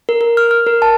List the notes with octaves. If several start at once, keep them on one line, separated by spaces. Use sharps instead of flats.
A#4
A#4
F6
F6
A#4
A5